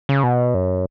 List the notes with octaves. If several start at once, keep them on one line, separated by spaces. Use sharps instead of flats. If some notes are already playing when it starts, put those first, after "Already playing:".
C#3
B2
F#2